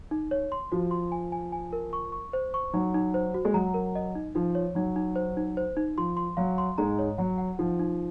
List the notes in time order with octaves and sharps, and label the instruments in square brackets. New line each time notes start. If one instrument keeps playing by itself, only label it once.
[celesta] D#4
C#5
C6
[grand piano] F3 [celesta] F#4
[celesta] C6
G#5
G#5
G#5
A#4
C#6
C#6
C5
C#6
[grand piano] F#3 [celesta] D#4
[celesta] D#4
C5
F#4
[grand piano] G#3
[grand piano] F#3 [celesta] A#5
[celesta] A#4
D#5
D#4
[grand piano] F3 [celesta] D#4
[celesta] C#5
[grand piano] F#3 [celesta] D#4
[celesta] D#4
C5
D#4
C5
D#4
[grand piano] F3 [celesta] C6
[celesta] C6
[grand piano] F#3 [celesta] F5
[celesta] C6
[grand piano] G#2 G#3 [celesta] A#5
[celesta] C#5
[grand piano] F#3 [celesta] F#5
[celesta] F#5
[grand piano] F3 [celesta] D#4
[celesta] D#4